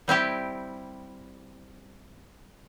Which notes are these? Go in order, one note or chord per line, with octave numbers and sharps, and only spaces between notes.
G3 C4 E4 G4